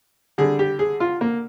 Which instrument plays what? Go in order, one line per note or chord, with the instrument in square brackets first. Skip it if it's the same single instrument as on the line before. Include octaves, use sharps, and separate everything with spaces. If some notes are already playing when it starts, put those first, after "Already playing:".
[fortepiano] D3 G3 G#4
G4
G#4
F4
A#3